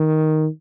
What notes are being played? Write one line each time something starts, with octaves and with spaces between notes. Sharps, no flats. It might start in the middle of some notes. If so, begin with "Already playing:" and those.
Already playing: D#3